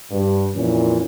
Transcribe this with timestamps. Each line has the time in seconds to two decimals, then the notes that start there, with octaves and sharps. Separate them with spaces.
0.11 G2
0.55 F2 A#2 E3 C#4